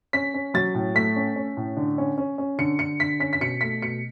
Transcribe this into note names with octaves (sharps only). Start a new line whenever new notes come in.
C#4 B6
C#4
F#3 A6
A2
A3 B6
C#4
C#4
A2
D3
C#4
C#4
C#4
D3 C#7
D3 C#7
D3 B6
C#4 B6
B6
B2 C#7
A3 B6
B2 C#7